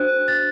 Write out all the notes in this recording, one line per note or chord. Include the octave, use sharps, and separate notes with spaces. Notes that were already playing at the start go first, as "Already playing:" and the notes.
Already playing: D4 F#4 C5 F#6
A6